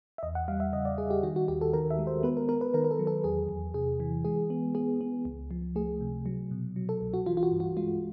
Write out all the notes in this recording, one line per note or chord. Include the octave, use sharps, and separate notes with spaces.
E5
E2 D#5
F#5
G3 F5
E5
C#3 D#5
D5
G3 G#4
G4
D#3 F#4
F#4
D#2 G4
A4
D#3 A#4
E5
G#3
C5
B3 B4
A#4
B3 A#4
B4
D#3 A#4
A#4
A4
F#3
A4
E2 G#4
E2
C3 G#4
E3
G#3 G#4
B3
B3 G#4
B3
C#2
F3
A3 G#4
C3
F#3
B2
F#3
A4
C2
F#4
E3 F4
F4
F#4
G2
F#4
G#3 F4